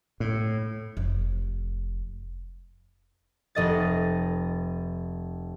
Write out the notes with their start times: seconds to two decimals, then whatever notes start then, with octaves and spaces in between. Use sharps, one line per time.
0.20 A2
0.97 F1
3.55 F1 D#5 A6